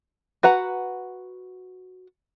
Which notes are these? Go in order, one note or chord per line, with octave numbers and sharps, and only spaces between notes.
F#4 B4 F#5 A#5